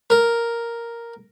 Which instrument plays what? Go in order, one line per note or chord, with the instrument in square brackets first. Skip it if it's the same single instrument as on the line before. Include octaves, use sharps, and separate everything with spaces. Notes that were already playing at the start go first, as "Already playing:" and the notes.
[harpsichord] A#4